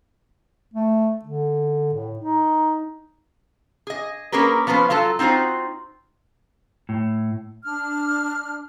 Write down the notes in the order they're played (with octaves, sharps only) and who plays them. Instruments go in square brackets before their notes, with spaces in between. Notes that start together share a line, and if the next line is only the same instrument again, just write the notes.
[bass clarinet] A3
D3
A2
D#4
[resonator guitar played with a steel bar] G#4 D#5
A#3 C#4 G#4 A#4 B4
F3 B3 C#4 B4 C5
F#3 F4 A4 A5
C4 D#4 F4 F#4 C5
[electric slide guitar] A2
[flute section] D4 F6